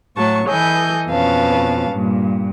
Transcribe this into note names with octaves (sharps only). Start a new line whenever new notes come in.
A2 F#3 A3 A5 C#6
E3 A4 D#5 G#5 G6
F2 B2 C#4 B4 F5 A5
G2 A#2